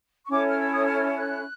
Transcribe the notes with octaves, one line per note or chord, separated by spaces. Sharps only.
C#6
C#4 E4 A4 C#5 D6
F6
E6
D#6
F6
F#6